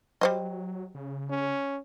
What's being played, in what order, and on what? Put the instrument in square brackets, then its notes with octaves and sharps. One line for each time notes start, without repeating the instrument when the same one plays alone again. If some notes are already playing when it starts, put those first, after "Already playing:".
[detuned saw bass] F#3 [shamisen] G3 C5 D#5
[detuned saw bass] C#3
[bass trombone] C#4